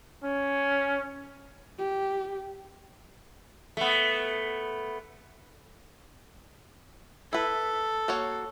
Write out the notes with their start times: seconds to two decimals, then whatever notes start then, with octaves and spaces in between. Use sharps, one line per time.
0.23 C#4
1.78 G4
3.77 A3 B3
7.33 E4 A4 B4
8.08 A#3 F#4 C#5